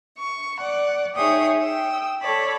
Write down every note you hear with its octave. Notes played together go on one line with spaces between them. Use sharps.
C#6
D5 F#5
D#4 G#4 C#5 E5 G5 D#6
G5 D#6 E6
A4 C#5 D5 B5